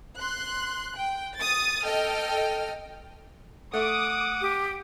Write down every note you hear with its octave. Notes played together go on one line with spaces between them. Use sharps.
C6 F#6
G5
D#6 A6
A4 D#5 G5 F6
A3 F#5 D6 D#6
G4